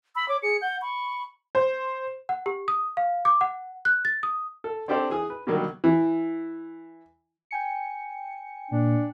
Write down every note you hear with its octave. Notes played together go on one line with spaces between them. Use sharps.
B5 E6
C#5 D6
G#4 C#7
F#5 G6
B5 C#6
C5
F#5
G4
D#6
F5
D6
F#5
F#6
A6
D#6
A4
C4 D4 G4 A4 C5 D5
E3 G#4 D#6
B4
B2 D3 D#3 F#3 G3 A#3
E3
G5 G#5 C#7
A#2 D4